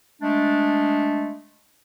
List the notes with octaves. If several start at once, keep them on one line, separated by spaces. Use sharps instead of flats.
G#3 A3 D4